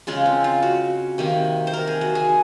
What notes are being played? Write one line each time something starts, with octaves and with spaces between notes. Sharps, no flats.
C#3 G#3 F4
C4
F4
F#4
C3 D#3 A#3
C5
A#4
G#4
F#4
G#4